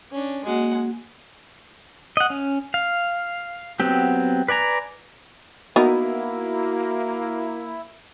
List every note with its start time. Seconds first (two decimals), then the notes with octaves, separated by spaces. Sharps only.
0.11 C#4 D4
0.45 G#3 A#3 F#4 D#5 F#5
2.17 D#5 F#5
2.30 C#4
2.74 F5
3.80 F#3 B3 C4 G4
4.48 B4 D5 G#5 A#5
5.76 A#3 B3 D#4 E4 F#4 A#4